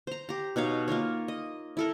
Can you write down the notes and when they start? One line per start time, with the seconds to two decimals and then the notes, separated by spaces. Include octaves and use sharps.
0.07 C5 A#5
0.29 G4 A#5
0.56 B2 D#4 C#5 F5
0.88 A#3 F4 A#4 C#5
1.28 D#5
1.77 E4 A4 A#4